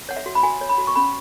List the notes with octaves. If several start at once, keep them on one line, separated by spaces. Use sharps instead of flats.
C#5 F#5
E5
F#4
B5
F#4 G#5
C#5
B5
F#4
C#6
C#4 B5